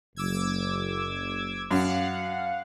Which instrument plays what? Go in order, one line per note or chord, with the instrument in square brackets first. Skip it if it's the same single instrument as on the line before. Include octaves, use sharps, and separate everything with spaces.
[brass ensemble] F#1 [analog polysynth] D6 E6 G#6
[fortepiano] F#2 [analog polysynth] F5 F#5